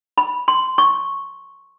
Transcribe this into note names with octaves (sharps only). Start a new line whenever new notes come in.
B5
C6
C#6